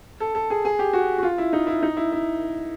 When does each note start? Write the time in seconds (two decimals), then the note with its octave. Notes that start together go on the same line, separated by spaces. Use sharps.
0.20 A4
0.35 A4
0.50 G#4
0.65 G#4
0.79 G4
0.93 F#4
1.18 F#4
1.23 F4
1.38 E4
1.53 D#4
1.67 E4
1.83 D#4
1.97 E4
2.12 E4